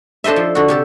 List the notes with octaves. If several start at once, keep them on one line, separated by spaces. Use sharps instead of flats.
D4 A4 C5 D#5 E5
F3
D3 F#4
C3 G4 A4